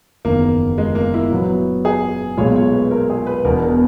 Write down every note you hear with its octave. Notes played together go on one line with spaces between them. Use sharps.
F#1 E2 D#3 A#3
G#3
A#3
E4
A#2 F#3 B3
G#4
B1 A#2 G#3 C#5
C#5
B4
A#4
G#4
B4
E1 E2 B2 A#4
A#4